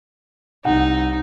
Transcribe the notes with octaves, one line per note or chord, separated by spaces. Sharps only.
C2 D#4 F#5